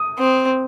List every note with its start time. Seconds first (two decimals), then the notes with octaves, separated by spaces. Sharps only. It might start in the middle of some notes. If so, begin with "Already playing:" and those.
Already playing: D#6
0.19 C4